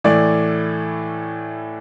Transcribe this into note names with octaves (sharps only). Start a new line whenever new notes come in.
A2 E3 A3 D5